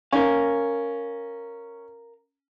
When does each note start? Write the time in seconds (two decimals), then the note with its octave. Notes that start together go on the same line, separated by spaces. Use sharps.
0.12 C#4 A#4 F5